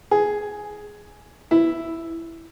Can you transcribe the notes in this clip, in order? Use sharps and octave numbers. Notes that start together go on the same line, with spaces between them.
G#4
E4